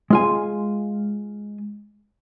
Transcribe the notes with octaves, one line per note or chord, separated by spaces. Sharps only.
G#3 F4 G#5